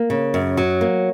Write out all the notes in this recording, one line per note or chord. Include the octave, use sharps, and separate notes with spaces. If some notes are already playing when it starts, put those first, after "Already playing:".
Already playing: A#3
C#3
F#2
F#3
A#3